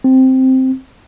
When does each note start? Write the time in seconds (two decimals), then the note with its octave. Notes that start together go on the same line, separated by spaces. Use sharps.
0.04 C4